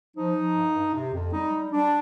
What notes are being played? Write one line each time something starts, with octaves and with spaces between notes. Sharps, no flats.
F3 D#4
F3
G2
G2
C3
F2
G3 D#4
G3
G3 D4